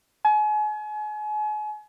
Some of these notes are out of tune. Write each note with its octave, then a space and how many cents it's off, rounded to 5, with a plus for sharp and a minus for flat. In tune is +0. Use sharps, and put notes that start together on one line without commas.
G#5 +35